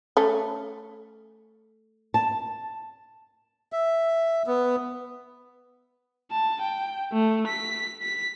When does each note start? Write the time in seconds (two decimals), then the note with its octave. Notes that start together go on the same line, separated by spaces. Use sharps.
0.17 A3 C#4
2.14 A5
3.73 E5
4.47 B3
6.31 A5
6.61 G5
7.13 A3
7.47 B6
8.03 B6